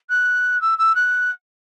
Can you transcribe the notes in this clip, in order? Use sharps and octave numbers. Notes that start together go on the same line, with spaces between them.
F#6
E6
E6
F#6